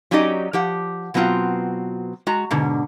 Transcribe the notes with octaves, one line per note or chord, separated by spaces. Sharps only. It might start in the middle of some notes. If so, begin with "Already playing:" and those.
F#3 C#4 D#4 G4 D5 D#5
F3 G4 F#5
B2 F#3 B3 C4 F4 F#4
G#3 F#4 A#5
G#2 B2 D3